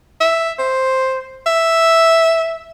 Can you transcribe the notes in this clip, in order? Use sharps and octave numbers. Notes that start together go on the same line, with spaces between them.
E5
C5
E5